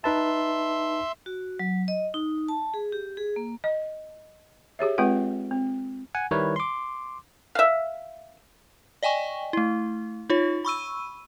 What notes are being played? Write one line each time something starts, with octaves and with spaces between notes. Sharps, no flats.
D#4 B4 E5 A5 C6
F#4
F#3
D#5
D#4
A5
G#4
G4
G#4
A#3
D#5
G4 G#4 C#5 E5
G#3 C4 F4 B4 F#5
C4
F#5 G#5
D#3 G3 E4 A#4 B4 C#5
C6 D6
E5 F5
D5 D#5 G5 G#5 C#6
A3 E4
D#4 F4 C#5
B5 C#6 E6 D#7